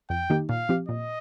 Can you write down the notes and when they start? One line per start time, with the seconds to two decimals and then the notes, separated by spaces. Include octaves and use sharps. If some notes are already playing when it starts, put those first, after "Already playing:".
0.10 F2 G5
0.30 D#3 A#3 D#4 G4
0.49 A#2 F5
0.69 F3 C4 G4
0.88 A#2 D#5